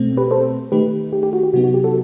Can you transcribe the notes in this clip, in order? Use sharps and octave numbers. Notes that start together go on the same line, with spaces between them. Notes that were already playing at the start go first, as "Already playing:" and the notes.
Already playing: B2 A3 C4
G4 B4
A4 C5
D#3 A3 D#4 G4 B4
G4
G4
F#4
G4
C3 F#3 B3 D#4 F#4
F#4
G4
F#4 A4